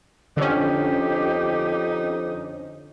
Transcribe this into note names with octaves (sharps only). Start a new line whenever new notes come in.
F2 D3 C#4 D#4 G4